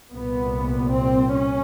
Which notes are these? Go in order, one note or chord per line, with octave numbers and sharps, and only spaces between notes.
C2 A#2 B3
C4
C#4